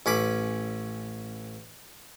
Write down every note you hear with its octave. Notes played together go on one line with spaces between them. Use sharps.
A1 C#4 B5 D6